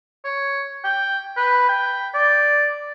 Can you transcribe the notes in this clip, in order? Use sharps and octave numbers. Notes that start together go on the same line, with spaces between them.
C#5
G5
B4
G5
D5